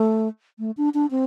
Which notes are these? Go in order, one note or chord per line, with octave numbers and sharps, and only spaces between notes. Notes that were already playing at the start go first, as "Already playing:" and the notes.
Already playing: A3
A3
D4
D4
C4